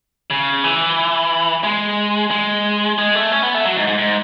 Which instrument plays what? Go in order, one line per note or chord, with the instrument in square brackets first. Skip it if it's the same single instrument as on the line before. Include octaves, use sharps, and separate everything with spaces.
[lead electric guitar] C#3
E3
G#3
G#3
G#3
A3
C#4
B3
A3
F#3
G#2
G#2
G#2